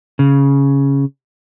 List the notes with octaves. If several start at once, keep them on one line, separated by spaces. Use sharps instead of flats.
C#3